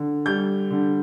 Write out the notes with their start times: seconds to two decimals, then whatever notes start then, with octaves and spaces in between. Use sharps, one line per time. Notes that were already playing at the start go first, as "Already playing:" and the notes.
Already playing: D3
0.26 G3 G6
0.71 D3